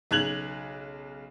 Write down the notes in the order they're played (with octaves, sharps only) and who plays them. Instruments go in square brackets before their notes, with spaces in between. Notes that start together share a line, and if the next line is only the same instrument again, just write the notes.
[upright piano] B1 C#3 F#6 G#6 F7 F#7